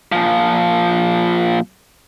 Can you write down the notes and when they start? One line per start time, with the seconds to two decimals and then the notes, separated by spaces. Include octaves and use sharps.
0.12 A#2 F3